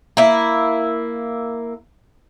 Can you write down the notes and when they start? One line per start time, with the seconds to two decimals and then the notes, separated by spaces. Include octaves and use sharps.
0.17 A#3 E4